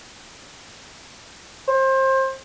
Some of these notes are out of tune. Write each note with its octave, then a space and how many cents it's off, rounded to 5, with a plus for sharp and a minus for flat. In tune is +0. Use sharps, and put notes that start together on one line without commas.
C5 +25